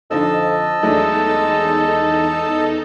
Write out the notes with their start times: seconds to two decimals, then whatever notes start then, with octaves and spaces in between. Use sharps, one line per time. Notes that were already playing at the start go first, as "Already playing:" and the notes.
0.11 F2 D3 F3 D#4 D#5 A5 E6
0.83 E2 F#3 G#3 A3 D4 D#4 A4